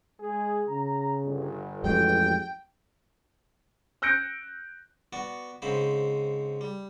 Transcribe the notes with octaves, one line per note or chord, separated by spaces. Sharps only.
G#3 G#4
C#3 A#5
G1
A1 F2 F#3 G#3 G5
E6 F#6 G6 A#6 C#7 D7
B3 F#4 D5
G#2 C#3 C4 C5 B5
G3